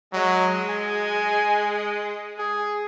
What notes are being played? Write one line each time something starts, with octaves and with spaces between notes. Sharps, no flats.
F#3 G#3
G#5
G#4